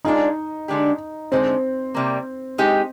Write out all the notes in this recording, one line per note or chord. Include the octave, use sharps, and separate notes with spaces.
G#3 D4 D#4 F4 G#4
D3 G#3 D4 G4
D3 G#3 C4 D#4
C3 G3 A#3
G#3 D#4 G4